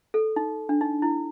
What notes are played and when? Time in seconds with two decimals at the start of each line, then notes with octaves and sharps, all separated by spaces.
0.14 A4
0.36 D#4
0.69 D4
0.81 D#4
1.02 E4